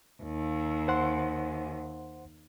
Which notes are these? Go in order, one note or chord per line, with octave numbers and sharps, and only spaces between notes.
D#2
C5 F#5 C6